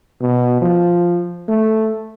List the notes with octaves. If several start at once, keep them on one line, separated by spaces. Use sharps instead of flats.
B2
F3
A3